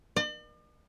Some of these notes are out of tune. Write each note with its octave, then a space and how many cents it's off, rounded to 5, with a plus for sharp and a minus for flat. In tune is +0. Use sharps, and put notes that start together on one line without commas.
D5 +45